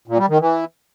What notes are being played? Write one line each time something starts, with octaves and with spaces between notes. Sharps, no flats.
A#2
G3
D#3
E3